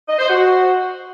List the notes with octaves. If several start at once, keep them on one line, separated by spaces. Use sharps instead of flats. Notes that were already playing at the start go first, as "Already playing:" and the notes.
D#5
C5
F#4